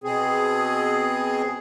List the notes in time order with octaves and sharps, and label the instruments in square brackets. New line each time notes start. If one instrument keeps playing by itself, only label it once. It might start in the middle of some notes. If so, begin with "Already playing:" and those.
[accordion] B2 C4 G#4